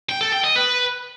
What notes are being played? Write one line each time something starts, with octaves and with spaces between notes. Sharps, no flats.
G5
A4
G5
D#5
B4